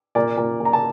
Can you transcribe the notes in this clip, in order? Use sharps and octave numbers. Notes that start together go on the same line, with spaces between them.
A#2 D5
A#2
A#2
A#5
A5